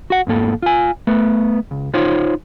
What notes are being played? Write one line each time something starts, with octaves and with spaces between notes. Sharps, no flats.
F#4 F#5
F2 G#2 A#3 A4
F4 G#5
A3 B3 B4
C#2
D#4 F4 C5 C#5